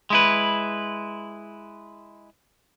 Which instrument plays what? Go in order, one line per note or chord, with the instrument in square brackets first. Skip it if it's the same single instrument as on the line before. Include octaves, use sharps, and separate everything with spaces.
[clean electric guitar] G#3 E4 B4